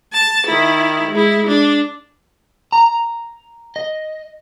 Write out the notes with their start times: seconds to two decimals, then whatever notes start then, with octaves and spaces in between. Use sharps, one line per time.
0.13 A5
0.47 D#3 E4
1.11 G#3 E4
1.47 D4
2.72 A#5
3.76 D#5